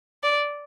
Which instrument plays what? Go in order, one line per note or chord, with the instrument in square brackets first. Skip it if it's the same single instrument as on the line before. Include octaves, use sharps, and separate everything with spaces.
[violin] D5